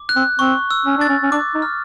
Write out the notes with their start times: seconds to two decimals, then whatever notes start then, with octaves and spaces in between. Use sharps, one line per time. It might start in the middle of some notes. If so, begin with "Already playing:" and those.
Already playing: D6
0.09 F#6
0.16 C4
0.39 C4 C#6
0.71 E6
0.86 C#4
0.98 D4 A6
1.09 C#4
1.23 C#4
1.32 D4 D6
1.55 D#4
1.62 F6